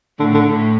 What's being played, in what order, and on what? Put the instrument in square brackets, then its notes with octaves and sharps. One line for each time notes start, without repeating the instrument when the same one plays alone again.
[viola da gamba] A2 [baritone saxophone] D3
[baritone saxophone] D3
[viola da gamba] A2